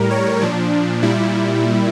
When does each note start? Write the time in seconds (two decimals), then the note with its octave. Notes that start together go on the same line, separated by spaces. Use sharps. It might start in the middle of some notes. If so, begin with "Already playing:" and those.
Already playing: A2 G3 A#4
0.11 C#5
0.41 A#2 F3 D4
1.03 A#2 G3 E4